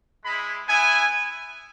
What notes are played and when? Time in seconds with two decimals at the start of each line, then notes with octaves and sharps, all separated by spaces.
0.24 G#3 E4 B5
0.68 B3 E4 G#5